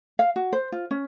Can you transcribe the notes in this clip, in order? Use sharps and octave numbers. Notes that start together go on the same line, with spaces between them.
F5
F#4
C5
F4
C#4